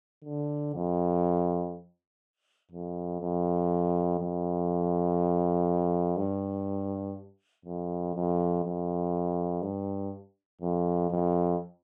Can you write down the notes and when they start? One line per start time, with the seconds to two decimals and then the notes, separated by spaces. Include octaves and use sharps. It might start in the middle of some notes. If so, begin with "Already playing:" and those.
0.24 D3
0.75 F2
2.72 F2
3.21 F2
4.20 F2
6.17 G2
7.65 F2
8.15 F2
8.64 F2
9.62 G2
10.61 F2
11.11 F2